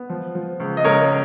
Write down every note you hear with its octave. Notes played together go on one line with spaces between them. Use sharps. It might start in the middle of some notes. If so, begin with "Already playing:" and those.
Already playing: B3
F3
F3
C#2
D#5
C#2 A#4 C#5